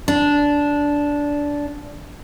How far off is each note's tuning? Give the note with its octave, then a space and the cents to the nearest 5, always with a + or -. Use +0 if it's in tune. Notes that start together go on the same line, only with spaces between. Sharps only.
D4 -15